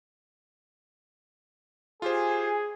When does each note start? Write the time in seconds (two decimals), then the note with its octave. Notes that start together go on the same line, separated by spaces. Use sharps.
2.02 F4 G4 G#4 C5 G#5